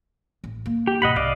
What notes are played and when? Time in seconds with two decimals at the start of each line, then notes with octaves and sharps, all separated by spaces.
0.44 A1
0.66 A#3
0.87 G4
1.02 G#2 B2 D#5 F#5 B5
1.16 C2 D5 D#5 F5